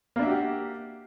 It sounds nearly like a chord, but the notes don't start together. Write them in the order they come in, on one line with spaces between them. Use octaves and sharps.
A#3 D4 E5 F#4 G4